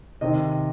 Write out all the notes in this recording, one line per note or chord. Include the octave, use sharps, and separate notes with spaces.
C3 D#3 D#5